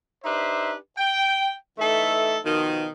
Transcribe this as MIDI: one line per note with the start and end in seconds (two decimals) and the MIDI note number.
0.24 0.73 62
0.24 0.73 63
0.24 0.73 67
0.24 0.73 71
0.24 0.73 72
0.24 0.73 76
0.98 1.52 79
1.78 2.37 52
1.78 2.37 57
1.78 2.37 63
1.78 2.37 69
1.78 2.37 76
2.44 2.88 47
2.44 2.88 51
2.44 2.88 53